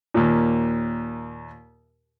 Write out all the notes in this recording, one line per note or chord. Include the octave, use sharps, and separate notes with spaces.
D#2 A#2